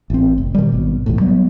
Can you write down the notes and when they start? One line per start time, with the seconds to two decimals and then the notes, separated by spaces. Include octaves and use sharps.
0.10 A1 C4
0.38 F1
0.55 B2 D#3 G3
0.72 G#1 B2
1.06 B1 E2 A2
1.20 F#3 G3 B3